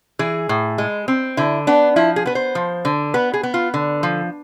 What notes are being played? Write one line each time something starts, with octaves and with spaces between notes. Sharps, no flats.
E3 G#4
A2
G#3
C4
D3 E4
B3 D4
F3 E4
G#4
B3 B4
C5
F3
D3
B3 B4
G#4
B3
F4
D3
F3